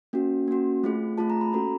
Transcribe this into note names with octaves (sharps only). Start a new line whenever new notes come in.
A#3 C#4 F#4
A#3 C#4 F#4
A3 C4 F4 G#4
A3 C4 F4 G#4 A5
A#5
B5
A#3 C#4 F#4 A4 A#5